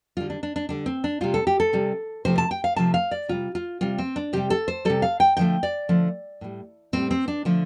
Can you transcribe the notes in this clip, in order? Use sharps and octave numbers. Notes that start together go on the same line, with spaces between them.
D3 G3 F4
D4
D4
D4
D3 G3 D4
C4
D4
C3 G3 F4
A4
G4
A4
C3 G3
C3 F3 A3 C5
A5
G5
F5
C3 F3 A3 A5
F5
D5
C3 G3 F4
F4
C3 G3 F4
C4
D4
C3 G3 G4
A4
C5
C3 G3 A4
F5
G5
D3 F3 A3 G5
D5
D3 F3 A3
A2 G3
A2 G3 C4
C4
D4
D3 F3 A3